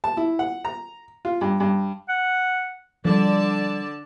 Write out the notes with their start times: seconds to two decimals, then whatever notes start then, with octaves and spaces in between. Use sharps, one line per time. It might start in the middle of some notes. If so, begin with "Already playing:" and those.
0.04 A5
0.17 E4
0.39 F#5
0.65 A#5
1.25 F4
1.41 G2
1.60 G2
2.09 F#5
3.05 D3 F3 G3 D5 A5